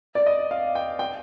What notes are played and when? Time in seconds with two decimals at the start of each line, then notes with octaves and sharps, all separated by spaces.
0.15 D5
0.27 D#5
0.51 F5
0.75 G5
0.99 G5